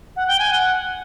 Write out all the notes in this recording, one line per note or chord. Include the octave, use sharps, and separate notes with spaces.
F#5
G5
G#5
F#5